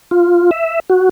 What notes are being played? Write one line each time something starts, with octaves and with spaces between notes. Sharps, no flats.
F4
E5
F#4